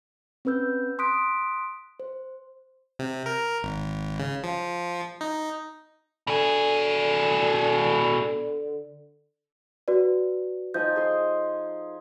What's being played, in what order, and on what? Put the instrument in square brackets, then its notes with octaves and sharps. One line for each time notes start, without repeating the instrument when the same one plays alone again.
[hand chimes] C4 C#4 B4 E6 G6
C6 D#6 F#6 B6 D7
C5
[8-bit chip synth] C3
A#4
G#1
C#3
F3
D#4
[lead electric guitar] B2 G#4 [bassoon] D3
[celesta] F#4 B4 D5
[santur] F3 D#4 G#5 [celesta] G6
[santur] G#4 C6